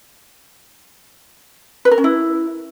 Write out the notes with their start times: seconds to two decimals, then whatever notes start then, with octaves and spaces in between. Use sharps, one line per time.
1.85 B4
1.91 A#4
1.98 C#4
2.04 E4